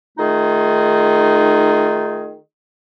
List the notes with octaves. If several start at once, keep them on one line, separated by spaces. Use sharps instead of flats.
D#3 A3 D#4 F4 G#4